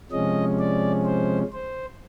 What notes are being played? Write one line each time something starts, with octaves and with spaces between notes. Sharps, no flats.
C3 F3 G#3 C#4 D#5
D5
C5
C5